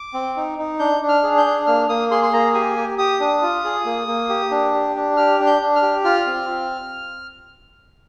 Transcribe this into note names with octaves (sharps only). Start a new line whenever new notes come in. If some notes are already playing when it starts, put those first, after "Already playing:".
Already playing: D6
C4
D#4
D#4
D4 G6
D4
F6
G#4
G6
D4
A#3 F6
A#3 D#6
G#4 C6
C6
A#3 A#5
G4 G#5
G4
G4 D#6
D4
F4
G#4
A#3
A#3
G4
D4
G4
D4
G4 F6
D4
G6
D4
F6
G4
F4 F6
C4